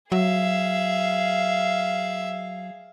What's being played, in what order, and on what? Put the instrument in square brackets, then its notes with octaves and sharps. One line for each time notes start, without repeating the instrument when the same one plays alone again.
[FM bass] F#3 [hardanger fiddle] G#4 F5 [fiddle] E5